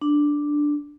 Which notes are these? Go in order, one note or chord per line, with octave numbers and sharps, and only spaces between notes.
D4